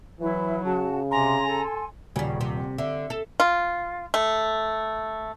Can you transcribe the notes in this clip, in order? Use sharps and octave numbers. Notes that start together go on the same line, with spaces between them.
E3 F#3 E4
C#3 F#4 A5
C3 G#5 A#5 C6
A4
D#1 C#3 G3
C3
D3 E5
A4
F4
A3